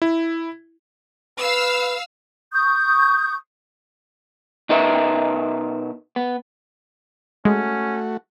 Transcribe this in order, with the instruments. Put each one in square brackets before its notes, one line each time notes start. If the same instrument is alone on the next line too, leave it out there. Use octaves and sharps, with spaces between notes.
[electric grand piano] E4
[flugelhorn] B4 [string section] F5 E6
[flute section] C#6 D#6 G6
[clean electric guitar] B2 D#4 A#4 B4 E5
B3
[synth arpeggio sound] G#3 [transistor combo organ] A3 F#4 [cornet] C#4